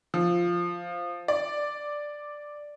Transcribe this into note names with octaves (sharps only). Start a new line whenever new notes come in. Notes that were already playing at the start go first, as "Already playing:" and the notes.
F3
D5